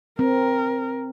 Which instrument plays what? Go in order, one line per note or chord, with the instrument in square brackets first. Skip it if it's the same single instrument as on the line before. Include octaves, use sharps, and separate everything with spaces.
[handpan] C4 [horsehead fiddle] A#4